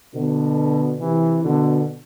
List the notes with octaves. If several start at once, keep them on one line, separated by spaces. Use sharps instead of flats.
B2 D3
C3 E3
B2 D3